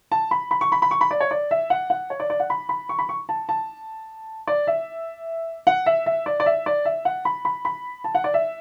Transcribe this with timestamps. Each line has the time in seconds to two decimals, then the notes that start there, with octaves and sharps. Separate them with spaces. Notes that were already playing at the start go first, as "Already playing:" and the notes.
0.12 A5
0.31 B5
0.51 B5
0.61 C#6
0.72 B5
0.82 B5
0.91 C#6
1.01 B5
1.11 D5
1.20 C#5
1.31 D5
1.51 E5
1.70 F#5
1.90 F#5
2.10 C#5
2.20 D5
2.30 D5
2.40 F#5
2.50 B5
2.69 B5
2.89 C#6
2.99 B5
3.09 C#6
3.29 A5
3.49 A5
4.47 D5
4.67 E5
5.67 F#5
5.86 E5
6.06 E5
6.26 D5
6.40 D5
6.46 E5
6.66 D5
6.85 E5
7.05 F#5
7.25 B5
7.45 B5
7.65 B5
8.04 A5
8.15 F#5
8.24 D5
8.34 E5